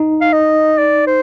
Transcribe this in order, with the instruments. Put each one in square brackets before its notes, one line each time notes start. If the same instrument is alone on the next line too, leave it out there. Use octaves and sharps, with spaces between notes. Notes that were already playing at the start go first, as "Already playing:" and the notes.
Already playing: [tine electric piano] D#4
[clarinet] F5
D#5
D5
C5